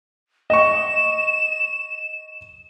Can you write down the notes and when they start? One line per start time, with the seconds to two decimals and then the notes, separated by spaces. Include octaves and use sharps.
0.50 D#5 C#6 E7